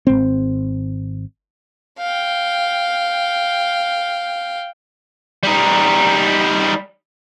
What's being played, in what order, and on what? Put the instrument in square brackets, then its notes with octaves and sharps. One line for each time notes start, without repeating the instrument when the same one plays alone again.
[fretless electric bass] G#1 C4
[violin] F5 G5
[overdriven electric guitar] G3 D#4